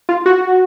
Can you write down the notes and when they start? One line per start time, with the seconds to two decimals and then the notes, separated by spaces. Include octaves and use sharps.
0.09 F4
0.26 F#4